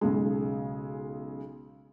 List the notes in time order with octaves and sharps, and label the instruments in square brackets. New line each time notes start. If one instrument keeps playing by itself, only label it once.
[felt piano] B1 C#3 G#3